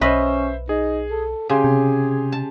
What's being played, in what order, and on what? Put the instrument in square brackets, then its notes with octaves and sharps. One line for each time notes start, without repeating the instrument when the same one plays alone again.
[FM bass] B1 [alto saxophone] C#4 [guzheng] B4 D#5 [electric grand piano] C5 E5
[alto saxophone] D#4 [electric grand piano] G#4
[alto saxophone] A4
[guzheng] C#3 [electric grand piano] G4 G#5 C6 [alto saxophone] G#4
[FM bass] C3
[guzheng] A5